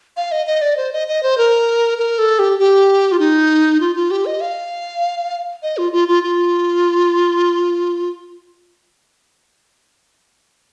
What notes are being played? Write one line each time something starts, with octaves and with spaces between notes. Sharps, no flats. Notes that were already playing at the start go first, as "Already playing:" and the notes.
F5
D#5
D#5
D5
C5
D#5
D#5
C5
A#4
A#4
A4
G4
G4
F4
D#4
F4
F4
G4
D#5
F5
D#5
F4
F4
F4
F4